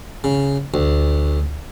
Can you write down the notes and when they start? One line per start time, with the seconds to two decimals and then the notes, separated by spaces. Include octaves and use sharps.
0.24 C#3
0.74 D2